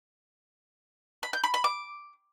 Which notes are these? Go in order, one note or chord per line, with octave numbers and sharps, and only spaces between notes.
B5
G6
B5
B5
D6